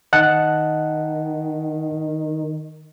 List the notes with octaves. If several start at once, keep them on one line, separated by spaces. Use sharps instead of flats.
D#3 D#5 F#5 A5